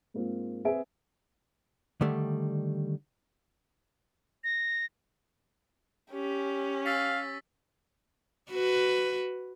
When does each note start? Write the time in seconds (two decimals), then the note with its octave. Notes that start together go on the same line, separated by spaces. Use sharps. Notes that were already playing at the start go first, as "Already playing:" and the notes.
0.14 G#2 A#3 C4 F4
0.65 C4 G#4 B4 E5 G#5 D7
2.01 D3 D#3 G3 A3
4.44 A#6
6.12 C#4 G4
6.86 F5 E6 A6 B6
8.50 F#4 B4